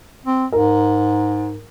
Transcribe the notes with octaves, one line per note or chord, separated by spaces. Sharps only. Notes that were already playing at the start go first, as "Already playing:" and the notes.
C4
G#2 A#4